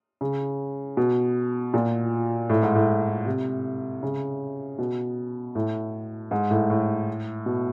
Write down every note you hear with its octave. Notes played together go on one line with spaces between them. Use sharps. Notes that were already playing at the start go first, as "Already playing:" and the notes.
C#3
B2
A#2
A2
G#2
A2
C3
C#3
B2
A2
G#2
A2
A2
B2